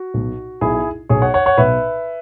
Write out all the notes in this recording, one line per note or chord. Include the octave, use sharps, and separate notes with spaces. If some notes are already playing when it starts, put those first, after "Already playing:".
Already playing: F#4
B1 B2
B1 B2 E4 G#4
B1 B2 G#4 C#5
C#5 F#5
C#5 F#5
C#5 F#5
B1 B2 B4 E5